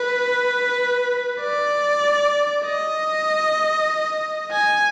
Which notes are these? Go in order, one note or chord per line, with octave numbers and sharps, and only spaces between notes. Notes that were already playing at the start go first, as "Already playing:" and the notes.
Already playing: B4
D5
D#5
G#5